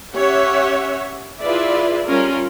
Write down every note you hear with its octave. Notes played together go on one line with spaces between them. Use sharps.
C#4 G4 C#5 E5 F#5
E4 F4 G#4 B4 D5 E5
G3 C#4 F4 A#4